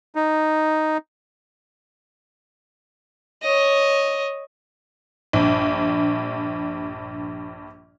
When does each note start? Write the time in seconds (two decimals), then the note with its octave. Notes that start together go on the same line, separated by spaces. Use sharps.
0.15 D#4
3.43 C#5 D#5
5.33 A#1 G2